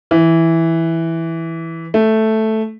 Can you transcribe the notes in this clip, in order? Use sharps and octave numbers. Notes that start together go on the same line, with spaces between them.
E3
A3